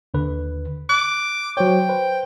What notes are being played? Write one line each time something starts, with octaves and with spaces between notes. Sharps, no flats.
D#2 D3 B4
D6 F#6
F#3 C5 C#5 G5
B4 C5